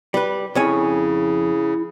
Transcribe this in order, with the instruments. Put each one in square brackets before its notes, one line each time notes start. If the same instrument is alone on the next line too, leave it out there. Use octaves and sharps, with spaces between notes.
[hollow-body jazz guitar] G3 B4
[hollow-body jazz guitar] F2 C#5 G#5 [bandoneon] C#3 [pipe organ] E4